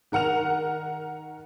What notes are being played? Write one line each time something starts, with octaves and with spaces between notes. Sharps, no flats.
D#3 A#4 F#5 F6 F7